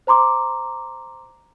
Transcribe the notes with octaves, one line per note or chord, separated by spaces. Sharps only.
C5 A#5 C6 D6